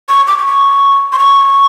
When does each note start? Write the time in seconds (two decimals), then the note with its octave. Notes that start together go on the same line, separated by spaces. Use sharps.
0.09 C#6
0.27 D6
0.38 D6
0.46 C#6
1.12 C6
1.19 C#6